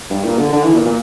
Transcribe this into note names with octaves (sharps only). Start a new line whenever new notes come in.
G2
A#2
D3
D3
E3
A#2
A#2